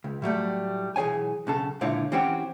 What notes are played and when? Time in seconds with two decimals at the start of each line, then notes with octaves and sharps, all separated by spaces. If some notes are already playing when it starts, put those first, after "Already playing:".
0.04 C#2
0.22 A2 F#3 G3 A3
0.96 B1 E3 G#4 C#5 G#5
1.47 B1 C#3 A4
1.81 C#2 A#2 D3 E4 C#5 F5
2.12 E3 C4 C#4 F#4 G4